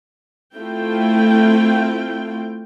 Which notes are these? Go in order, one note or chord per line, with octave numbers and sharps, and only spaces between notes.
A3 C4 E4 F4 G5